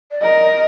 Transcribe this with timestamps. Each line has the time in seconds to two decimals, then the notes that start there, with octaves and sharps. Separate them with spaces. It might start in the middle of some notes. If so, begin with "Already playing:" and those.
0.11 D5
0.21 A#4 D#5